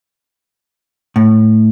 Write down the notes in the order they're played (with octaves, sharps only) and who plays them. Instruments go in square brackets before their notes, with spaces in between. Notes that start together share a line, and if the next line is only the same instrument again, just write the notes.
[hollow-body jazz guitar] A2